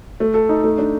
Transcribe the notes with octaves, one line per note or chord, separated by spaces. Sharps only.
A3
A4
D#4
A3
D4